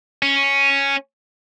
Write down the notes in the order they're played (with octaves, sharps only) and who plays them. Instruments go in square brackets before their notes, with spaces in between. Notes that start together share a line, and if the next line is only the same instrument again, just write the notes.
[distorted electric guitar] C#4